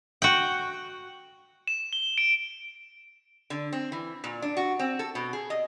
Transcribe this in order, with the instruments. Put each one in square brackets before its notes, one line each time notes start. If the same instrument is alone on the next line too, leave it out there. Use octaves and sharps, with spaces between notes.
[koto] F#4 G5
[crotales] E7
G7
D7
[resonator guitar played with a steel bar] D3
C4
E3
A#2
D4
F#4
C4
A4
B2
G#4
D#5